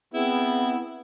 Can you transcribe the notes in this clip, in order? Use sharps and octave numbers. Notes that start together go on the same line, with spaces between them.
B3 C4 E4 G#4